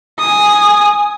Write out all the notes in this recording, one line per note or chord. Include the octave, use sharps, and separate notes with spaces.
G#5 D#6